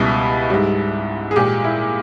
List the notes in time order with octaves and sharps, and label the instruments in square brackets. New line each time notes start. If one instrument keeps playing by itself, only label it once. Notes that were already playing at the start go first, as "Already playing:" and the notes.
Already playing: [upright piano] C#2 B2 G3 E4
G#2 G3
G#4
A#2 G#3 G4
E4